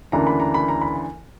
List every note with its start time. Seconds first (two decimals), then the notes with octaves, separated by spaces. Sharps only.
0.12 D2 C#3 E3 A#3 D4 A#5
0.27 B5
0.40 A#5
0.54 B5
0.69 A#5
0.81 B5